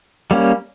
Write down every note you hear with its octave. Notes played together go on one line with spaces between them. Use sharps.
G3 A#3 C#4